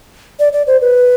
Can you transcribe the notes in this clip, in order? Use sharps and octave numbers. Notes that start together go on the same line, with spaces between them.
D5
D5
C5
B4